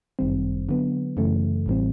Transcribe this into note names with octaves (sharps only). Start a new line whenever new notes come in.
G1 F#2 D#3 G3 C4
D3 F#3 B3
F#2 C#3 E3 A3
A1 A2 E3 G3 C4